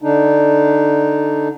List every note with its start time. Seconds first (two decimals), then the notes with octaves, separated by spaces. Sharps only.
0.02 D3 D4 D#4